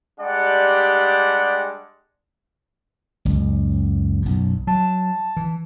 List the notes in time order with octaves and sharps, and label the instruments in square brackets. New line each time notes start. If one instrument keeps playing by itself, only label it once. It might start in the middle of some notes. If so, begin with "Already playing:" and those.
[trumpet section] G3 G#3 D4 G4 D5 F#5
[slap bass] F#1 C#2
B1 F#2
[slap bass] F#3 [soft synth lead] A5
[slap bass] E3